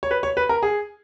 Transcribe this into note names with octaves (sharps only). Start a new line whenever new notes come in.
C#5
B4
C#5
B4
A#4
G#4